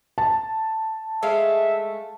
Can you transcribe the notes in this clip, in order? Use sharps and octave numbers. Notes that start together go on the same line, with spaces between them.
A5
G#3 A3 E5 F5